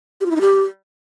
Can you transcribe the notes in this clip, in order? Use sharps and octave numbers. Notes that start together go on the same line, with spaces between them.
G4
F4
E4
D#4
G4